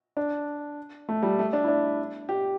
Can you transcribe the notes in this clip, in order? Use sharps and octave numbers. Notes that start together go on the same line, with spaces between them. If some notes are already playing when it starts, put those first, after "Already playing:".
D4
A3
G3
A3
D4
E4
D4
G4